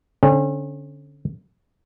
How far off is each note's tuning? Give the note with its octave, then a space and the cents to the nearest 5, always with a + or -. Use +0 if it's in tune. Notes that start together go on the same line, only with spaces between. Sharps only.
D3 -20 C#4 -40